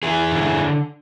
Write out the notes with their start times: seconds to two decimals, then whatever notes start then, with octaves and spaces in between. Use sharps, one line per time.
0.03 E2 E4 G#4
0.32 D3